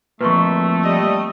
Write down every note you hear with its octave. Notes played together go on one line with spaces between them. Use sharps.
F2 A#2 A3 B4 C6 C#6
G3 D#5